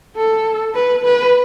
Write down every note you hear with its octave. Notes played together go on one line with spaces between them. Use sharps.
A4
B4
B4